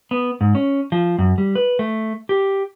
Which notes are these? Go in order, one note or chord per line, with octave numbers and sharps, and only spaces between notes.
B3
G#2
C#4
F3
F#2
G3
B4
A3
G4